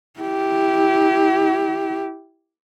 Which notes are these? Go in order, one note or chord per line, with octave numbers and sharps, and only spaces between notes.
E4 G4